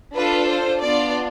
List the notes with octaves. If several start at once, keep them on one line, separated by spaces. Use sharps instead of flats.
D4 F4 A4 B4
C5
B3 D4 F4 D5